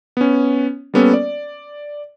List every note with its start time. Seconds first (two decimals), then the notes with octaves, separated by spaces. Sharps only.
0.17 B3 C#4
0.94 G3 A#3 B3 C#4 A4
1.14 D5